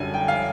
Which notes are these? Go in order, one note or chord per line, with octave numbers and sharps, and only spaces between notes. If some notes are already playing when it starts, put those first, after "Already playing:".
Already playing: F#2 D3 G3 G#5
G5
F5